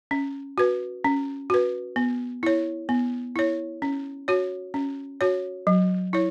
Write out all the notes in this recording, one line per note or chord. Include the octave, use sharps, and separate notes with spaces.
C#4
F#4 B4
C#4
F#4 B4
B3
E4 C#5
B3
E4 C#5
C#4
F#4 C#5
C#4
F#4 C#5
F#3
E4 C#5